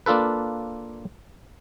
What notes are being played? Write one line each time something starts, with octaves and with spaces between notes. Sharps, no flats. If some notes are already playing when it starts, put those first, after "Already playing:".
A#3 D4 F4 A4 B4